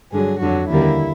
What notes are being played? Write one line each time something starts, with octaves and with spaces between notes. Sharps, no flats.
G2 D3 F#3 G#4
F2 D3 F#3 F#4
D#2 D3 G3 A#3 E4